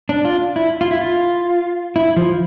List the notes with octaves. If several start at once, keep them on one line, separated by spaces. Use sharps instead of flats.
D4
F4
E4
F4
E4
F4
E4
F3